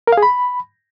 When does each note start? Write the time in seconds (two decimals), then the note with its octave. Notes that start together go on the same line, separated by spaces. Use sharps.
0.07 A#4
0.12 F5
0.17 G#4
0.22 B5